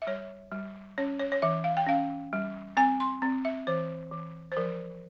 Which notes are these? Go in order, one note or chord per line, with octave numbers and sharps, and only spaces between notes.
E5
G3 C#5
G3
C#4 C#5
C#5
C#5
E3 E5
F5
G5
C#4 F5
G3
C4 G#5
C6
C4
E5
E3 C5
E3
C5
F3 A#4